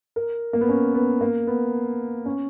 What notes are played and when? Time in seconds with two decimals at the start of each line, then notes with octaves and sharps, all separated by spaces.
0.16 A#4
0.53 A#3
0.61 B3
0.69 C#4
0.94 B3
1.21 A#3
1.47 B3
2.26 C#4